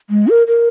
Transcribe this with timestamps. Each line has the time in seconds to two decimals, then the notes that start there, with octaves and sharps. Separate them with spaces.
0.10 G#3
0.28 A#4
0.47 A#4